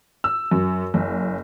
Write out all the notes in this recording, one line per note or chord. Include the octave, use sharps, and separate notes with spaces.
E6
F#2
F#1